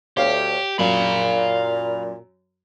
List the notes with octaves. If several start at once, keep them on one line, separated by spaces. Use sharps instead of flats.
D2 G4 C#5 F5
F#2 A#2 F5 B5